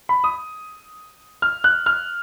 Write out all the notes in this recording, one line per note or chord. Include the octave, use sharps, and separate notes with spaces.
B5
D#6
F6
F#6
F6